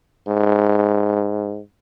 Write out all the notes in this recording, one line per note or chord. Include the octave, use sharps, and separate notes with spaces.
G#2